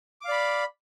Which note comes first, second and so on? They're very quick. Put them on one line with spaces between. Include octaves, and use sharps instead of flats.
D6 F5 D5 B5